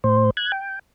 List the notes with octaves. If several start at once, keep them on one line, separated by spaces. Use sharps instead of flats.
A2 C5
F#6 G#6
G5